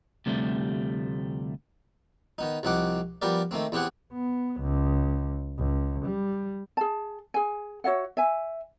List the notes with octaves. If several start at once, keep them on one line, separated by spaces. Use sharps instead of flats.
D2 C3 F3 G3 A3
D#3 B3 D#4
C2 F3 C4 D#4 F#5 D6
F3 G3 B3 G4 A#4 D5
D#3 A3 A#3 C4
E2 B3 C4 G4 G#4 F#5
B3
C#2
C#2
G3
G#4 A5
G#4 G#5
F#4 C#5 E5 F#5
E5 G#5